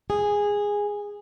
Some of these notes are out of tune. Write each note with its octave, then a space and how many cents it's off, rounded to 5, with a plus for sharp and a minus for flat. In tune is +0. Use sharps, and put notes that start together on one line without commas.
G#4 -10